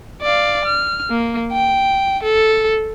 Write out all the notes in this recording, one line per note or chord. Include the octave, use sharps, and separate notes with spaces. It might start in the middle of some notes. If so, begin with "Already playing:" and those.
D5 F5
F6
A#3
G5
A4